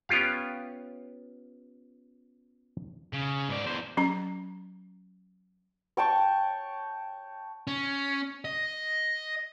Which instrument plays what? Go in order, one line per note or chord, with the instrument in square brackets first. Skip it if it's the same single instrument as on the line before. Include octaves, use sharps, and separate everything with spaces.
[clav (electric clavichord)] B3 C#4 F4 G4 F5
[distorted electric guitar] C#3
G#2 D5
E2 C5
[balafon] F#3 C#4 A#5
[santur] C#5 G5 A5 C#6
[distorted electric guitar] C#4
D#5